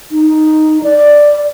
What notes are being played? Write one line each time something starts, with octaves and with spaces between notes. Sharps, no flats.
D#4
D5